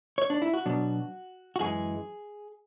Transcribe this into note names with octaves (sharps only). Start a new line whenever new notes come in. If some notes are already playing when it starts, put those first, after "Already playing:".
C#5
D4
E4
F#4
B2 F#3 B3 D4
F#4
F#2 E3 G#3 G#4